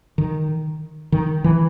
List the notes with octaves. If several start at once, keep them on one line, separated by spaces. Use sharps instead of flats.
D#3
D#3
E3